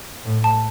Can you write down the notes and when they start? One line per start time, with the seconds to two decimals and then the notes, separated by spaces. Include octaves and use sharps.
0.24 A2
0.44 A5